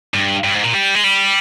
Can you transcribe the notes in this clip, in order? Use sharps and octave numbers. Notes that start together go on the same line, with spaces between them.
G2
G2
G#2
A#2
G3
G#3
G3